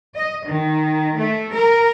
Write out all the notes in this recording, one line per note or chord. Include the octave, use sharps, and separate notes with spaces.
D#5
D#3
A3
A#4